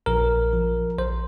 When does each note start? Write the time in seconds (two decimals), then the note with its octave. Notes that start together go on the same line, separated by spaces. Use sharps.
0.06 A#1 A#4
0.53 F3
0.98 A#1 C5